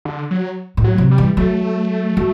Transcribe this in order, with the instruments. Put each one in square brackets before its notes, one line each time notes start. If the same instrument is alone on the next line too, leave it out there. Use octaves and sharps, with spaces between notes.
[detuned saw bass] D3
F#3
[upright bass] A2
[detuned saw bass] F#3
[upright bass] C3
[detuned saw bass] G3
[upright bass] E3
[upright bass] F#3 [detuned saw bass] A3
[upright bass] F#3